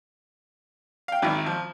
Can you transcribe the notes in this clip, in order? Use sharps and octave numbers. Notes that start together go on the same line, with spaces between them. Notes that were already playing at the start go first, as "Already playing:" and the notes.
F5 G5
G#1 D#3 D#4 E4
F3